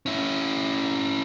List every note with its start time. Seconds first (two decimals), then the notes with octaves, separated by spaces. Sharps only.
0.06 C#4 E4